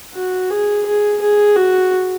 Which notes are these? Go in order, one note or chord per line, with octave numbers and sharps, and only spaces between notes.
F#4
G#4
G#4
G#4
F#4